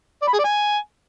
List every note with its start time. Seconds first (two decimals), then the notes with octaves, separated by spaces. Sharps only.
0.22 D5
0.28 B5
0.33 G#4
0.39 D5
0.44 G#5